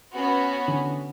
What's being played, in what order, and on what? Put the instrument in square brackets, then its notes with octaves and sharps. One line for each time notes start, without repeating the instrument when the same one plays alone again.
[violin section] B3 C#4 F#4
[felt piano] D3